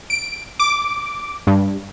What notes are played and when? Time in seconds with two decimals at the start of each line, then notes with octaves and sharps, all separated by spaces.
0.10 D7
0.59 D6
1.47 G2